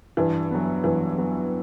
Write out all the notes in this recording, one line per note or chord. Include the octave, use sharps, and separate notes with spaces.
G2 E3
F#3 B3
G2 E3
F#3 B3